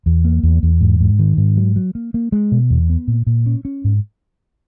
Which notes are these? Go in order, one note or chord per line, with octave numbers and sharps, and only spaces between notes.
E2
A#3
E2
E2
G#2
G#2
D#3
G#2
F#3
F#3
A#3
A#3
G#3
B2
E2
B3
A#2
A#2
C#4
C#4
G#2